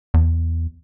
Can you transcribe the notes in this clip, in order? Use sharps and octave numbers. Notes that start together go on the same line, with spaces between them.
E2